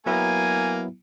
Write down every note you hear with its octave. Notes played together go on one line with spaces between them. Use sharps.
F#3 A#3 B3 E4 G#5 A#5